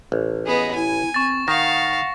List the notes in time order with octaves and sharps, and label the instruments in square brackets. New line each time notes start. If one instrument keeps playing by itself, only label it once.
[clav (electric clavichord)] A1
[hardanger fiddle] B3 G#4 [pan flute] D#5
[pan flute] E4 [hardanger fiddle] G#5
[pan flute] C4 [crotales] C#6 A6
[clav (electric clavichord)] D#3 [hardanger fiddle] F5 [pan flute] F#5 [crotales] A#6